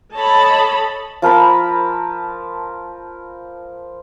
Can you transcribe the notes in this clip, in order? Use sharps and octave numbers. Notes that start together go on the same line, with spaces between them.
A4 C#5 D#5 A5 B5
F3 A#4 A5 B5